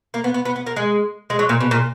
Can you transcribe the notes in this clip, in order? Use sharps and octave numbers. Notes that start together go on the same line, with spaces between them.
A#3
B3
B3
B3
B3
A#3
G#3
G#3
F#3
A#2
B2
A#2